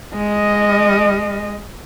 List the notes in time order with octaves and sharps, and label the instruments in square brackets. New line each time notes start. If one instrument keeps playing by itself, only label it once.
[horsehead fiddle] G#3 D#5